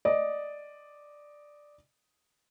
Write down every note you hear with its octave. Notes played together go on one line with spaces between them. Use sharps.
D5 D#5